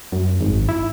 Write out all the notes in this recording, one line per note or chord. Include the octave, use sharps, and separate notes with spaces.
F#2
G#1
E4